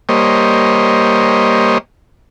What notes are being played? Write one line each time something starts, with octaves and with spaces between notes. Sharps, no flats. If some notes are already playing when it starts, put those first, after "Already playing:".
G3 A#3 C5 C#5 D#5